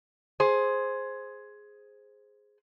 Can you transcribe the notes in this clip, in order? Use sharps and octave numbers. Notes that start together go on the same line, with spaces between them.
G#4 C5